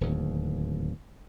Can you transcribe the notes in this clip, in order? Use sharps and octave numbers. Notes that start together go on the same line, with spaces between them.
D1 D#2